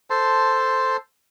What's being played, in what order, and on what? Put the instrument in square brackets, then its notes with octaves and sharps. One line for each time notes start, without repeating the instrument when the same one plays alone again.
[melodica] A4 C5 A5 C6